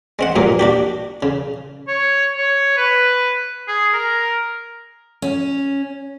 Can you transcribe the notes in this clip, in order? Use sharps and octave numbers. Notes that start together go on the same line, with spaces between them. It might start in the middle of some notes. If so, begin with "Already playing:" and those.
G#3 C4 F#5
G2 A#2 F#3 A#3
D4 F#4 G4
C#3
C#5
C#5
B4
G#4
A#4
C#4